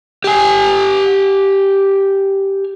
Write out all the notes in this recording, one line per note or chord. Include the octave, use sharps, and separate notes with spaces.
G4 G#5